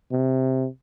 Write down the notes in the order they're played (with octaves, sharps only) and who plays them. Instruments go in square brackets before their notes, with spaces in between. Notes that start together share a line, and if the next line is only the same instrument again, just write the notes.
[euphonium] C3